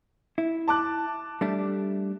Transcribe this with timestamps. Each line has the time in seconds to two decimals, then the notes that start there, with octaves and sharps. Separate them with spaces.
0.38 E4
0.68 A5 D6 F#6
1.41 G3 A3 D4